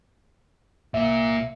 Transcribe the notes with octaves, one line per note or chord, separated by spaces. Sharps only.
C2 A#2 A#3 E5